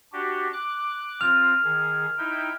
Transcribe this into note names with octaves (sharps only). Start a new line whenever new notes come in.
D4 F#4 G4
D6 F#6
C4 F4 F6 F7
D#3 G#4
D#4 E4 G5